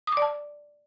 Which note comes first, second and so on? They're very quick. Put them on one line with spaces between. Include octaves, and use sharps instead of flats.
D#6 D6 D5 A5